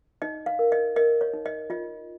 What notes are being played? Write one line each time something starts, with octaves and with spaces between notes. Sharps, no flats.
D#4 D#5
F5
A#4
D#5
A#4 D#5
C#5
D#4
D#5
F4 D#5